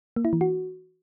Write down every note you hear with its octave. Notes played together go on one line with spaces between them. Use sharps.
A#3
E4
E3
F#4